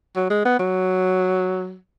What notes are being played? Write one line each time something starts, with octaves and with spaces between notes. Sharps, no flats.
F#3
G#3
B3
F#3